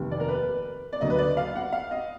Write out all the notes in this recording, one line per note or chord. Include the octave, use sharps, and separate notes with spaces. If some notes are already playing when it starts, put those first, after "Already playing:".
Already playing: F1 D#2 D#3
D5
A#4
B4
D5
D2 D3 F#3 A#3 D#5
B4
D5
F5
F#5
F5
D#5